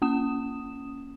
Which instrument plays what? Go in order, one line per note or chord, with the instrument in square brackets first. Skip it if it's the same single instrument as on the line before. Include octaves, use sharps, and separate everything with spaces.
[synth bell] A#3 C#4 D#6 E7